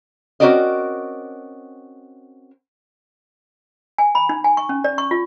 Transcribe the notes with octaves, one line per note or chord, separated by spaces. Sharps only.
C4 C#4 F#4 A#4 D5 D#5
G#5
B5
D#4
G#5
C#6
C#4
D5
C#6
F4